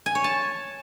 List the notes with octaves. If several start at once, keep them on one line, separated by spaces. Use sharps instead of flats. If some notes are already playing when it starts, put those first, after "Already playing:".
G#5
C#5
A5